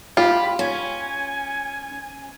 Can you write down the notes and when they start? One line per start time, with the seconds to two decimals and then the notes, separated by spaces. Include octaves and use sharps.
0.17 F4 G4 B5
0.59 C#4 G#5